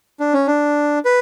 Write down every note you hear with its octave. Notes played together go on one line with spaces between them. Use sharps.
D4
C#4
D4
B4